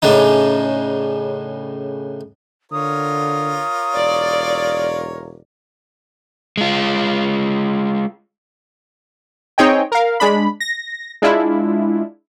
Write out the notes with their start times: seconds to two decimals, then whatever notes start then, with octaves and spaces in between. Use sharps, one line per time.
0.02 A2 C#3 D4 D#4
2.72 D3 F4 A#4 C#5 D#6
3.95 E1 D5
6.57 G#3 F4
9.58 C4 D#4 G#4 C#5 D#5 G5
9.92 A#4 F5
10.20 G#3 D4 B5
10.60 A#6
11.22 G#3 D4 E4 F4